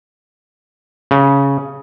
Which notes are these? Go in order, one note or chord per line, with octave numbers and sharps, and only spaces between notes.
C#3